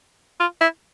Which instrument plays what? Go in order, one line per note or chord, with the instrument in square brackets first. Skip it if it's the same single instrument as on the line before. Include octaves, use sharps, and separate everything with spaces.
[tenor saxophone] F4
E4